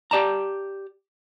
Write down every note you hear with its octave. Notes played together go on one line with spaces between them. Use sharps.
G4 D5 A5 A#5